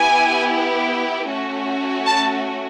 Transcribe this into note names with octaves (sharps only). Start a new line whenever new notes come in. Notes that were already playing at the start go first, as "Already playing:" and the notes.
Already playing: B3 E4 G4 G#5
A3 C#4 F#4
A5